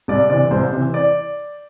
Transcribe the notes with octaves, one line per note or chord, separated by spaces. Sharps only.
C2 D5
C3 E3 D5
C2 C5
C3 E3
D5